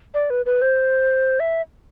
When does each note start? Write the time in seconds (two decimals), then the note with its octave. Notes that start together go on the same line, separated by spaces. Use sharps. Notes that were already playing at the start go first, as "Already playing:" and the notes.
0.14 D5
0.30 B4
0.46 B4
0.62 C5
1.40 E5